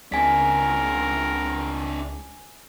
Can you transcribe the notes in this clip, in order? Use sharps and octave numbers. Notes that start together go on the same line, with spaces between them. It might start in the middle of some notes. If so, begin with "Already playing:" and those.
C#2 C4 D4 A#4 G#5 B6